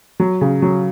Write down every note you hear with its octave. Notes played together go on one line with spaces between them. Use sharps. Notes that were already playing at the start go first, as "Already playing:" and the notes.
F#3
C#3
F#3